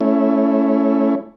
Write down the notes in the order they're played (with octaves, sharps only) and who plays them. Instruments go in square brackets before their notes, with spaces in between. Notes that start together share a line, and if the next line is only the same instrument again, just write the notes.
[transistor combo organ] A3 C#4 E4